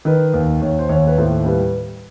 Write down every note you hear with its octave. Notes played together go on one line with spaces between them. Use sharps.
D#3 B4
D#2
D#2 C#5
C5
D#2 C#5
B4
A2 C5
G3 B4